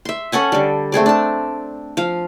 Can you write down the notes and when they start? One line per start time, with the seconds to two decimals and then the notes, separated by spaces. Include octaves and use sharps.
0.05 E5 C6
0.32 C#4 A4 F#5 G#5
0.52 D3 G3
0.92 A3 C4 G#4 D5
1.06 D4 A5
1.97 F3 F5